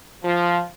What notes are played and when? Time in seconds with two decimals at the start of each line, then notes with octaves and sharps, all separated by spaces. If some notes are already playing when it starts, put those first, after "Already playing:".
0.23 F3